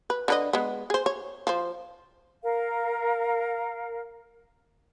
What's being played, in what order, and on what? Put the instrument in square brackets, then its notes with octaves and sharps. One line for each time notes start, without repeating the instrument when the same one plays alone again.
[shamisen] B4
D3 B4 D#5
G#3 B3
G#4 C5
C#5
F3 C5
[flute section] A#4 F5